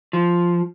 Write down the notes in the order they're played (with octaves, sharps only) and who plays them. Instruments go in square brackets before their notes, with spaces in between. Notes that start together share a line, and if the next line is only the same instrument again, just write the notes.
[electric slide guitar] F3